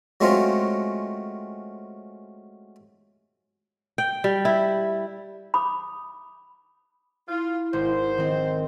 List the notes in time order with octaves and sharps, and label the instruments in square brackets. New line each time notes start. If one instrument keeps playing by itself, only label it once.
[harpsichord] F#3 G#3 A3 C4 C#4 F4
[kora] G5
G3
E4
[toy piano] B5 D6 D#6
[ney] E4 [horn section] F4
[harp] G#1 [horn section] C5
[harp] D#3 C4